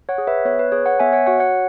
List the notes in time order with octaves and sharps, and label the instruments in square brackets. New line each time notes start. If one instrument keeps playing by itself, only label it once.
[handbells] C#5 F#5
G#4
B4 E5
B3 C#5
B4
G#4 C#5
C#5 F#5
B3 E5 G#5
C#5 F#5
F#4 C#5 F#5
C#5 F#5